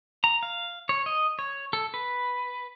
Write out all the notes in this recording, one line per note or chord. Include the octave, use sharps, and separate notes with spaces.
A#5
F5
C#5
D#5
C#5
A4
B4